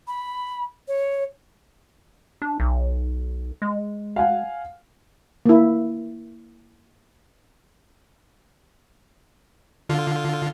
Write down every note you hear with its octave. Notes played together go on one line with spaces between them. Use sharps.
B5
C#5
D4
B1
G#3
F5 F#5 G#5
A#3 E4
D3 F4